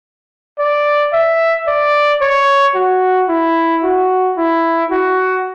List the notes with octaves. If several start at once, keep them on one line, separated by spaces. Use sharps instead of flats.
D5
E5
D5
C#5
F#4
E4
F#4
E4
F#4